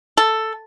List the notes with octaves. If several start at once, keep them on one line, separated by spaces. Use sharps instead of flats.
A4